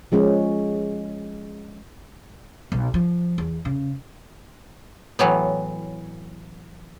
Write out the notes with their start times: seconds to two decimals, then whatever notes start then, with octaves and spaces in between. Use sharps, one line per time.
0.12 F3 G#3 C#4
2.72 B1
2.94 F3
3.38 E2
3.65 C#3
5.19 A2 E3 F#3 B3